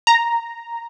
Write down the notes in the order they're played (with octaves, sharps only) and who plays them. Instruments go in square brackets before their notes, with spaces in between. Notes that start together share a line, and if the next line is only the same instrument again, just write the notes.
[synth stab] A#5